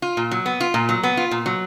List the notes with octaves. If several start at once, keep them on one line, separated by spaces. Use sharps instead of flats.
F4
A#2
F#3
B3
F4
A#2
F#3
B3
F4
A#2
F#3